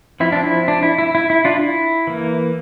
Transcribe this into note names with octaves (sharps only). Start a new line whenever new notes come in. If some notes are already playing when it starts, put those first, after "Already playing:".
F3 C4 E4
D4
E4
D4
E4
E4
E4
E4
D4 F4
E4
E3 A#3